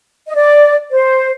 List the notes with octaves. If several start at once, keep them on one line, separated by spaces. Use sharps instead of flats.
D#5
D5
C5